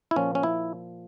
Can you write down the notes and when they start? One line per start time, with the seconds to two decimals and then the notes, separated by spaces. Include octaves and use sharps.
0.11 E4
0.16 A#2 F3 C#4
0.35 C#4
0.43 E4